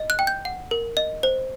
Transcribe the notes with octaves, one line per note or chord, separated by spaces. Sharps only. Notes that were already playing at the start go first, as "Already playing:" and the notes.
Already playing: D#5
F#6
G5
G6
F#5
A#4
D#5
C5